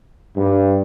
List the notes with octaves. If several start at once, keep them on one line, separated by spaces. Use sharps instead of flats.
G2